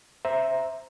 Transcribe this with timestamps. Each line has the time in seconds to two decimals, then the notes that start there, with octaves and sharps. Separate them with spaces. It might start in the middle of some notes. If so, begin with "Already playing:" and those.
0.25 C5 E5 A#5